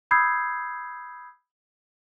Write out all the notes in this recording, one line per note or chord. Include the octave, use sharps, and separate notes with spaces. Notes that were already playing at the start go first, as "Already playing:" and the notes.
B5 D#6 E6 G6 G#6 C7